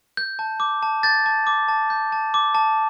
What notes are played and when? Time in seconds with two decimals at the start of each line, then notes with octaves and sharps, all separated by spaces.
0.17 G6
0.39 A5
0.60 D6
0.83 A5
1.03 G6 A6
1.26 A5
1.47 D6
1.68 A5
1.90 G6
2.12 A5
2.34 D6
2.55 A5